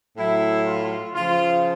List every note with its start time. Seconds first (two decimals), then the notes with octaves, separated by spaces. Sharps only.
0.17 A2 F#3 E4
0.66 F4
1.15 C#3 F3 F4